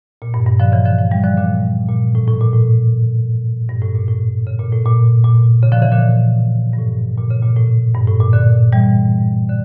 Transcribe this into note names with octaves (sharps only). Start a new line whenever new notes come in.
A#2
G2
G2
D3 F3
C#3 E3
D3 F3
D3 F3
E3 G3
D3 F3
A#2 D3
A#2
A2
A2
A#2
A2
G2
A2
A#2
A2
C#3
A#2
A2
A#2
A#2
C#3
D3 F3
C#3 E3
A#2 D3
G2
A2
A#2
C#3
A#2
A2
G2
A2
A#2
A#2 D3
E3 G3
D3